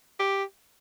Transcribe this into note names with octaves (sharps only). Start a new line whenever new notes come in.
G4